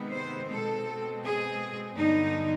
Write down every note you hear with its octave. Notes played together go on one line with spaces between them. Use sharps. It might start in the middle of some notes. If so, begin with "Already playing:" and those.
Already playing: C3 D#3 G#3 B3
C5
B2 G#3 C4 A4
G#4
G2 D3 F#3 B3 D#4